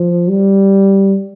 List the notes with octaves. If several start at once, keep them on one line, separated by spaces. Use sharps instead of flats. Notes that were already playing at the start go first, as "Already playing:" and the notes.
Already playing: F3
G3